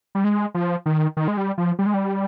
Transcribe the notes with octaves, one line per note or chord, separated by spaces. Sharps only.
G3
G#3
F3
D#3
D#3
G#3
G3
F3
G3
G#3
G3